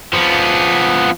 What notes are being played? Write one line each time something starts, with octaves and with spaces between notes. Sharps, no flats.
F3 B3